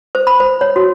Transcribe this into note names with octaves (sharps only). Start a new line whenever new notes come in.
C5
B5
C5
C#5
F#4